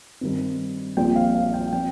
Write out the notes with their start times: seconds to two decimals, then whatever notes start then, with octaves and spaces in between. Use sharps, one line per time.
0.21 G2 D#3 C4
0.97 A#1 A#2 G3 C4 G5
1.16 F5
1.35 F5
1.54 G5
1.73 F3 C4 G5